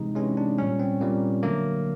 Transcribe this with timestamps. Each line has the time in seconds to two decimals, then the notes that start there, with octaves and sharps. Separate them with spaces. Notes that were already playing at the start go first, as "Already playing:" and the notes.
Already playing: C3 E3 G#3 D#4
0.15 C3 E3 G#3 C#4
0.37 D4
0.58 A#2 G3 C#4
0.80 C4
1.01 A#2 G3 A#3
1.43 D3 F#3 A3 A#3